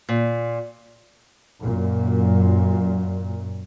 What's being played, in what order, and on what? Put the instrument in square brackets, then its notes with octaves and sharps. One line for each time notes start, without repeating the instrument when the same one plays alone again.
[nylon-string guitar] A#2
[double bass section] F#2 A#2